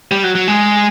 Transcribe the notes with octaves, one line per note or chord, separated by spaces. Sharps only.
G3
F#3
F#3
G#3